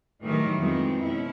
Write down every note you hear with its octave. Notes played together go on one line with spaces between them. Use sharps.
A2 D#3 E3 F#3 G3 A3
F2 G#3 B3 C4 D#4
B2 C#4 E4